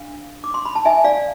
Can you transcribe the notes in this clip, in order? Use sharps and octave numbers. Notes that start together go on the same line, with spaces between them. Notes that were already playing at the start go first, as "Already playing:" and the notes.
Already playing: D4 F5
D6
C6
B5
A5
E5 G#5
D5 F5